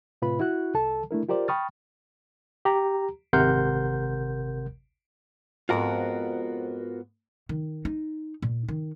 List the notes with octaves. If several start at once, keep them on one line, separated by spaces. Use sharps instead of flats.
A2 C3 F4 B4 B5
E4 F#4 F#6
C2 A4 A5
A3 D4 E4 A#4
F4 G4 A#4 C5 D5
G5 B5 C#6 D#6 F6 A6
G4 A#5
G#1 C3 A#4 F#5 C6 G6
F2 G#2 B3 F4 F#4 A#4
D#3
D#4
A#2
D#3